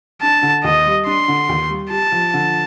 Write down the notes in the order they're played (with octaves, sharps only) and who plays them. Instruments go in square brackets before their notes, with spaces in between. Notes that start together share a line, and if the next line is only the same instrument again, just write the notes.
[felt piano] D4 [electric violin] A5
[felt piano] D3
[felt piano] D#2 [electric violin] D#5
[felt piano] G3
[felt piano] D4 [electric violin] C6
[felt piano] D3
D#2
G3
[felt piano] G4 [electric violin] A5
[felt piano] F3
D3